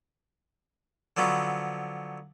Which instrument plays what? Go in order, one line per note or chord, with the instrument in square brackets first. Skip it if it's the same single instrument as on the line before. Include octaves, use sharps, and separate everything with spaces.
[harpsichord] D3 F3 F#3 B3 C4